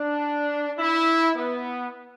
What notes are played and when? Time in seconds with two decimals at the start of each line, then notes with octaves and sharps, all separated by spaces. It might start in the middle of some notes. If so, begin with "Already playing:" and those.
Already playing: D4
0.79 E4
1.36 B3